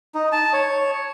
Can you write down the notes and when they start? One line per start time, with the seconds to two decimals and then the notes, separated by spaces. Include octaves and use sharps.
0.15 D#4
0.32 A5
0.53 C#5